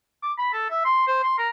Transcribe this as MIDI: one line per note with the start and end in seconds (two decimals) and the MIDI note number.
0.23 0.32 86
0.38 0.50 83
0.53 0.68 69
0.70 0.82 76
0.85 1.05 84
1.07 1.21 72
1.23 1.37 84
1.38 1.49 70